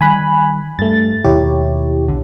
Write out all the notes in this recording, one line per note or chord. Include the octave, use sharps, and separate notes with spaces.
D#3 G3 G#5 B5 F#6
G2 A3 A6
D#2 B2 D#3 E4 G4 C#5
B1 D3